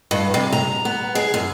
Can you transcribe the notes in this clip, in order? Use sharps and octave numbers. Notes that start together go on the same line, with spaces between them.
G2
C3
A#5
B3
G#4
F#2